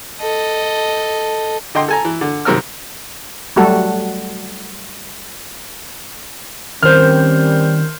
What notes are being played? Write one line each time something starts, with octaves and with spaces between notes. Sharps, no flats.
A4 D#5
D3 D#5 G5 C6
A4 G#5 A#5
E3
D3
F#2 C3 D#3 A#4 E6 F6
F#3 G3 A3 F#4 A4
D#3 G3 C4 C#4 A#4 C5 F6 G6